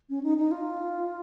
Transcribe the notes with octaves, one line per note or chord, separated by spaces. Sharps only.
C#4
D#4
D#4
F4